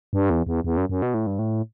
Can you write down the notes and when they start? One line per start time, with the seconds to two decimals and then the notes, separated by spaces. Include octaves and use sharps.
0.13 G2
0.30 E2
0.46 E2
0.64 E2
0.77 F#2
0.89 F#2
1.02 B2
1.14 A2
1.27 G2
1.39 A2